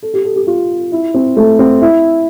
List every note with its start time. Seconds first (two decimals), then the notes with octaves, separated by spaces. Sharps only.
0.03 A4
0.14 G4
0.24 A4
0.36 G4
0.47 F4
0.92 E4
1.14 C4
1.37 A3
1.59 C4
1.82 E4